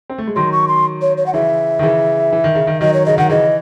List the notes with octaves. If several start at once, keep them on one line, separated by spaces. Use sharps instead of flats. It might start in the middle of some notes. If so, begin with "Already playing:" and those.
C4
A3
G#3
D#3 F#3 C6
C#6
C6
C#5
C#5
F#5
C#3 E3 E5
D#3
C#3 E3
E3
D#3
C#3
D#3
D#3 F#3 D#5
C#5
C#3 D#5
D#3 F#5
C#3 E3 D#5